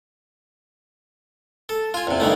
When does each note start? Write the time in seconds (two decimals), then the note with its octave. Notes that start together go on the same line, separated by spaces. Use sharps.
1.69 A4
1.94 F4 G#5
2.07 E2 C3
2.20 G2 D#3 E3 A3